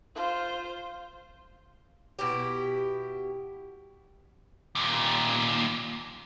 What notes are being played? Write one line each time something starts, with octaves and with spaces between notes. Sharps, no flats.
F4 C5
B2 E4 G4
D#2 A#2